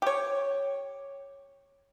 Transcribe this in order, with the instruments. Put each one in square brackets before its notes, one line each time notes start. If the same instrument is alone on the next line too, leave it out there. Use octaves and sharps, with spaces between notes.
[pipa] G4 C#5